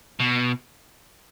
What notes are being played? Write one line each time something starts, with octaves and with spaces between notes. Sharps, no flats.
B2